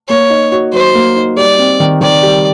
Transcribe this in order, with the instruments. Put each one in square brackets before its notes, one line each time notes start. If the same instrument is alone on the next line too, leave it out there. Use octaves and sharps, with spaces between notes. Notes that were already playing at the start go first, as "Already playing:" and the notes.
[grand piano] A#3 [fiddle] C#5
[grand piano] D#4
F#4
[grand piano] F#3 [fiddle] C5
[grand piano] A#3
D#4
[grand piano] G3 [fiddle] D5
[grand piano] C4
D#3
[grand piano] D#3 [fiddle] D5
[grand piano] G3